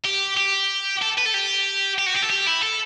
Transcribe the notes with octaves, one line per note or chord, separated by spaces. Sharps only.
G4
G4
A4
B4
A4
G4
G4
F#4
G4
A4
G4
E4
A4